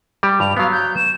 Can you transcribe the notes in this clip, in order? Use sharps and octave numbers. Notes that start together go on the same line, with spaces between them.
G3 G4
G2 F7
F#3 B3 F5
G6
E7